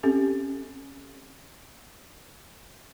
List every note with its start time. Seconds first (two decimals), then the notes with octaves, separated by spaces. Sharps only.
0.03 C4 C#4 G4 A4